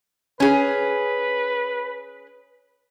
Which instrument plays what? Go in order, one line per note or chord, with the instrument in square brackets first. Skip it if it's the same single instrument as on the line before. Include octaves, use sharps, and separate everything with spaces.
[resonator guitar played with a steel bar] C#4 G#4 [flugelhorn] B4